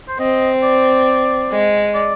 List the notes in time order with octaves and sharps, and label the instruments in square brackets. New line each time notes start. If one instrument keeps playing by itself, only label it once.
[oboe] C5
[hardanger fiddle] C4 [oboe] D#5
[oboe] D5
[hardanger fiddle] G#3
[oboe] D5